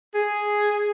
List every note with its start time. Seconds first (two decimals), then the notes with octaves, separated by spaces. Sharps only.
0.15 G#4